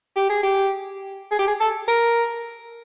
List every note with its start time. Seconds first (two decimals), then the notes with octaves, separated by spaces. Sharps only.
0.16 G4
0.29 G#4
0.43 G4
1.31 G#4
1.39 G4
1.47 G#4
1.60 A4
1.88 A#4